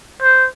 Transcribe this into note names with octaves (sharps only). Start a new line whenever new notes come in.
C5